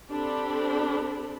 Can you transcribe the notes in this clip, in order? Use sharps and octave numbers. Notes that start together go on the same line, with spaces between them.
C4 D4 G4 A4 B5